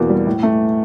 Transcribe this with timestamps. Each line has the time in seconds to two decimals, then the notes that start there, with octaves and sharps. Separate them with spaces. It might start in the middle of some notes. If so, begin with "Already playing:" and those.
Already playing: E2 B2 A#3
0.09 G3
0.27 A2
0.43 A3